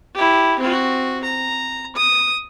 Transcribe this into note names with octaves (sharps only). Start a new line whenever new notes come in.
E4 G4
C4 F#4
A#5
D#6